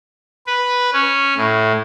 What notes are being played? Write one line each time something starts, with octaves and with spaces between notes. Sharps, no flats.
B4
C#4
A2